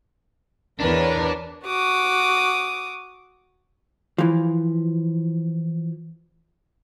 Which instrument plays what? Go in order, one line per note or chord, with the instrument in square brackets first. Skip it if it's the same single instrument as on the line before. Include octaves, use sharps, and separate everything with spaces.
[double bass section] E2 E3 [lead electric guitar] D4 [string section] A#4 B4 C#5
[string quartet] F#4 D6 D#6
[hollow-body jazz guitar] E3 F3